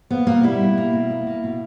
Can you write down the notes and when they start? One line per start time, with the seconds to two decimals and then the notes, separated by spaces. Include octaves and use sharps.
0.11 A#3 B3
0.27 B2 A#3
0.43 G3 E4
0.61 B2
0.78 A#3
0.93 B2
1.10 A#3
1.27 A#3
1.44 B2